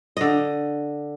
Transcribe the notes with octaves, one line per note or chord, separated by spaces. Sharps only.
D3 D#5